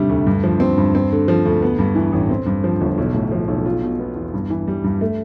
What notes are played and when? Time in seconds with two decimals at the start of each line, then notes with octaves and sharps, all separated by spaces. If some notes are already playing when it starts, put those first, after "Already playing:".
Already playing: A2 C3 G3 D4
0.10 D2
0.27 G2
0.44 F3
0.60 C4
0.78 G2
0.95 C4
1.12 D3
1.28 F3
1.45 D2
1.62 B3
1.79 G2
1.95 E3
2.12 A1
2.30 C4
2.46 G2
2.64 F3
2.81 G1
2.98 B1
3.14 A2
3.31 F3
3.48 B1
3.66 F4
3.83 B2
3.99 B3
4.16 E2
4.34 G2
4.50 E3
4.68 G3
4.84 G2
5.01 A3